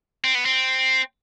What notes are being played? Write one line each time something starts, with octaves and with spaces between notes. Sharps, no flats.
C4
B3
C4